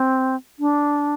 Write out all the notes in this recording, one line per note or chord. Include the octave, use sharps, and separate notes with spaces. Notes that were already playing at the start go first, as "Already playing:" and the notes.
Already playing: C4
D4